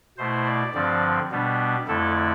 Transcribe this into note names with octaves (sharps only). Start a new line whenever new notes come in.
B2 A3 E4 C5
D5
G2 D3 F3 C4 D5
B2 G3 B3 D4
F2 D3 A3 E4 A4